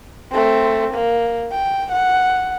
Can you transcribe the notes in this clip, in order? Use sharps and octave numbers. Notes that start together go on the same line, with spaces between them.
A3 C4
A#3
G5
F#5